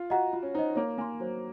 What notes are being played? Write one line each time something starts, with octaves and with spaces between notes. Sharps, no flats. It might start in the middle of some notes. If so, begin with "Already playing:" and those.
Already playing: F4
F#4 D#5 F#5 A#5
F4
C#4
D#4 C5 D#5
A#3 C#5
A#3 G#5 C6
F#3 C5